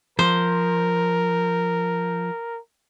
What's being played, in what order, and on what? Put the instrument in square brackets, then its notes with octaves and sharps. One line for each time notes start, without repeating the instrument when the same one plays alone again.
[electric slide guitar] F3 [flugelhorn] A#4 [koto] C5